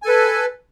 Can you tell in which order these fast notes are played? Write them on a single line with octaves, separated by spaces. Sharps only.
G#5 A4 B4